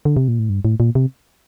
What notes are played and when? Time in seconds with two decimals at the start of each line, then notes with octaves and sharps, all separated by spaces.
0.05 D3
0.17 C3
0.28 A#2
0.39 A2
0.49 G2
0.65 A2
0.80 A#2
0.95 C3